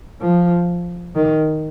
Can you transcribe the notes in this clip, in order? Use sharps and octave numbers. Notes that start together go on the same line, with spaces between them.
F3
D#3